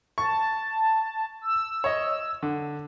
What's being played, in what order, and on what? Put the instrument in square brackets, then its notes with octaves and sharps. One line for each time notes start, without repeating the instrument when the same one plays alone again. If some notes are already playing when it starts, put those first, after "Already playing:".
[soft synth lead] A5 [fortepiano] C#6
[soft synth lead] E6
[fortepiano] C#5 D#5
D3